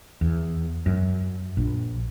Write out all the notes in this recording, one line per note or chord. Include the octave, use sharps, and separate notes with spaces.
E2
F#2
A#1